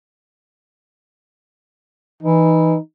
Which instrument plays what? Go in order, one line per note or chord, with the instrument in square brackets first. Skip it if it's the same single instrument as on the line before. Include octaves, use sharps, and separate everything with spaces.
[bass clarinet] E3 [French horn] D#4